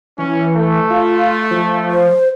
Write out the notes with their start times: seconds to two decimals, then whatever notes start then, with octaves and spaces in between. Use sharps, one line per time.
0.18 E3 C#4
0.56 A3
0.90 F4
1.51 F3
1.91 C5